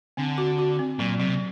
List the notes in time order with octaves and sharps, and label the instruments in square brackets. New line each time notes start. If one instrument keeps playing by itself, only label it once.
[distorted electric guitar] D3 [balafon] C4
[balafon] F#4
F#4
C4
[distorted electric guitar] A#2 [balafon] F#3
[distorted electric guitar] C3 [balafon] F#3